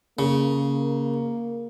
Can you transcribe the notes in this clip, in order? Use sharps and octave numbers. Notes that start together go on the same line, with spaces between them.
C#3 A#3